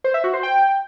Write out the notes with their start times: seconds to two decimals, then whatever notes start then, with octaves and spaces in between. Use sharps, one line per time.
0.04 C5
0.14 E5
0.24 F#4
0.33 C5
0.43 G5